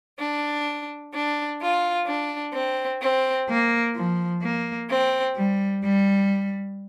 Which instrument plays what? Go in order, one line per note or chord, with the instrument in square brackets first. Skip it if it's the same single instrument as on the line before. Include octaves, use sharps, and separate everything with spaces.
[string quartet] D4
D4
F4
D4
C4
C4
A#3
F3
A#3
C4
G3
G3